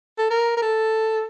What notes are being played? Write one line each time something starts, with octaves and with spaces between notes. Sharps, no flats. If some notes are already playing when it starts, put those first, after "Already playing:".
A4
A#4
A#4
A4